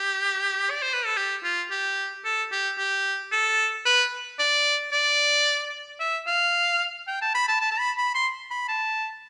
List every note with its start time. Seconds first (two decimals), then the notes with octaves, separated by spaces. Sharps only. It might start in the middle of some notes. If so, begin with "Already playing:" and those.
Already playing: G4
0.71 D5
0.82 C5
0.94 B4
1.05 A4
1.17 G4
1.43 F4
1.71 G4
2.25 A4
2.52 G4
2.78 G4
3.32 A4
3.86 B4
4.39 D5
4.92 D5
6.00 E5
6.27 F5
7.08 G5
7.22 A5
7.35 B5
7.48 A5
7.61 A5
7.72 A5
7.79 B5
7.98 B5
8.15 C6
8.51 B5
8.68 A5